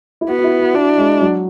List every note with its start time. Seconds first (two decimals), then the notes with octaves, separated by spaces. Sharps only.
0.21 E4
0.28 B3 F#4
0.39 F#4
0.44 E4
0.60 F#4
0.74 D4 E4
0.98 G#3
1.21 F#3